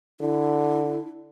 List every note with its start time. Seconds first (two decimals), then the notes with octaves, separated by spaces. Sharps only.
0.20 D3 E4